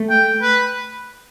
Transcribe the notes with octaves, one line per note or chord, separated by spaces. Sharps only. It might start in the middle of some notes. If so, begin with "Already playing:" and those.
Already playing: A3
G5
B4